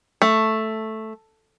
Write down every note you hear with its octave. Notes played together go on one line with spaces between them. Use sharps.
A3